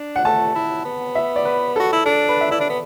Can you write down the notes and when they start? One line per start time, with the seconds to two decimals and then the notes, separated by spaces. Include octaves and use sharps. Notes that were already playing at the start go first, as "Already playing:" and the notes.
Already playing: D4
0.16 F#5
0.25 A3 A5
0.55 E4
0.85 B3
1.15 E5
1.36 D5
1.45 B4
1.76 A4
1.80 F#4
1.93 E4
2.06 D4 A4
2.29 B4
2.41 E5
2.51 E4 D5
2.60 D4
2.70 B3